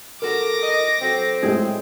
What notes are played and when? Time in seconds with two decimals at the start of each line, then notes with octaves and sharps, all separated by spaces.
0.22 F#4 A4 A#4 D6 A#6
0.63 D#5
1.01 F#3 C4 F#4 A4
1.42 A2 G#3 G#4